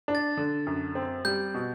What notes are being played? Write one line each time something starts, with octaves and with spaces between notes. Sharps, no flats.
D4
A6
D3
F#2
C4
G3 G6
B2